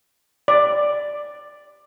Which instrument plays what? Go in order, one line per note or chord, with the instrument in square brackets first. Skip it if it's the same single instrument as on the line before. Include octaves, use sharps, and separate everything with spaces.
[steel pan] D5